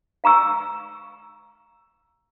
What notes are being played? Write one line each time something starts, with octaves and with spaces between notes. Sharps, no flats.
F5 A#5 C#6 E6